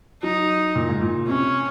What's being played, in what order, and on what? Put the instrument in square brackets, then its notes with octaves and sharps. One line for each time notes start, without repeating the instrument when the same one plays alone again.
[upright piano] F#3 [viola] D#4
[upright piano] A#2
G#2
A#2
[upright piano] C3 [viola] C#4